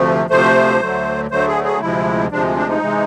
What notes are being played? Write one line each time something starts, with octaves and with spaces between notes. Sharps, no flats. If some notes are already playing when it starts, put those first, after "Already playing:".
Already playing: D2 C3 F3 A3
D2 C3 F3 A3 C5
D2 D3 F#3 A3
D2 D3 F#3 A3 C5
G#4
G#4
D2 C3 F3 G#3 E4
D2 C3 F3 G#3 D4
D4
D#4
C3 E3 G#3